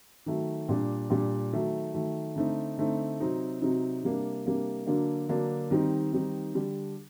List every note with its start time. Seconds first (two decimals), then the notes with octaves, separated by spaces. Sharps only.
0.26 D#3 F#3 A3
0.69 A#2 G3 D4
1.10 A#2 G3 D4
1.53 D#3 F#3 A3
1.94 D#3 F#3 A3
2.36 D3 A3 C4 D#4
2.77 D3 A3 C4 D#4
3.20 C3 F#3 C4 D#4
3.61 C3 F#3 C4 D#4
4.03 C3 G3 A#3 D4
4.45 C3 G3 A#3 D4
4.87 D3 F#3 A#3 D4
5.29 D3 F#3 A#3 D4
5.71 D#3 G3 C4 D#4
6.13 D#3 G3 C4 D#4
6.54 D3 G3 D4